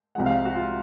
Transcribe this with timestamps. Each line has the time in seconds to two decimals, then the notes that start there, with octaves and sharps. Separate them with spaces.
0.15 C2 C3 F3 G#3 F#5
0.26 F5
0.45 F#4
0.55 F4